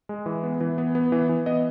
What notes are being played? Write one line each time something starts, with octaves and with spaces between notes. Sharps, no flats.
G#3
E3
B3
E3
B3
B3
E3
E3
B3 D#5